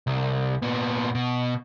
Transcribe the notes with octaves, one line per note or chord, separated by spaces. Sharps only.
C2
A#2 B3
B2